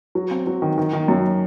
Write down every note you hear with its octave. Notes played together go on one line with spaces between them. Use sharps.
F#3
C4
F#3
D#3
D#3
D#3
F#2